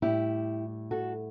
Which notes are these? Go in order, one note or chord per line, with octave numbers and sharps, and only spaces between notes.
A2 G3 E4 G4
F#4 A4